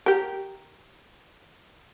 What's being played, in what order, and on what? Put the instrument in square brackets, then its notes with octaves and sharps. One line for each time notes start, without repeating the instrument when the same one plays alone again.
[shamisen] G4 A#4